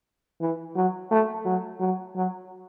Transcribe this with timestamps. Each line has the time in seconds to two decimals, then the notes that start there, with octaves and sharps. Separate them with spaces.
0.41 E3
0.76 F#3
1.11 A3
1.45 F#3
1.80 F#3
2.15 F#3